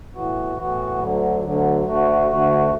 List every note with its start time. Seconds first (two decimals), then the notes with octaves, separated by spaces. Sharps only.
0.14 A2 E3 B3 F#4
0.57 A2 E3 B3 F#4
0.99 D2 D3 F#3
1.43 D2 D3 F#3
1.85 D2 D3 A3 F#4
2.28 D2 D3 A3 F#4